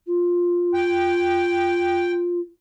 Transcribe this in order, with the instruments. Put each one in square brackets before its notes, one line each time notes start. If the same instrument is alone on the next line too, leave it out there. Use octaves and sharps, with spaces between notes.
[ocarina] F4
[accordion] G5